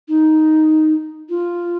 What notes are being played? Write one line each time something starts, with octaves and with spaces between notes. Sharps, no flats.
D#4
F4